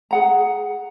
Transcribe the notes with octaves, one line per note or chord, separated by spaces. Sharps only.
G#4 F#5 A#5